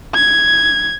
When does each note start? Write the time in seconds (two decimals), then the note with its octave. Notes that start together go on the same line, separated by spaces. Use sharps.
0.14 G#6